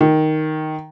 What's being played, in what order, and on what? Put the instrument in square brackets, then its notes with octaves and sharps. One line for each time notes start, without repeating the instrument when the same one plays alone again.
[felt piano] D#3